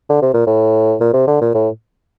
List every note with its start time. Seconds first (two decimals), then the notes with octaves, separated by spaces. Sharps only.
0.09 D3
0.22 C3
0.34 A#2
0.47 A2
1.01 A#2
1.13 C3
1.28 D3
1.41 A#2
1.54 A2